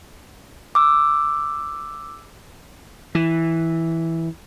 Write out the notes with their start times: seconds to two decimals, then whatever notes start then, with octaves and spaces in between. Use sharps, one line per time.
0.75 D6 E6
3.15 E3